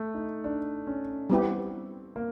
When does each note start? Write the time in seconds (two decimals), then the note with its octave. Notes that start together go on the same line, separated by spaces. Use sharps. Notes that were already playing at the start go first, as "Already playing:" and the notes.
Already playing: A3
0.14 D#4
0.44 D4
0.87 C#4
1.30 G3 B3 C4 E4 G4
2.16 A#3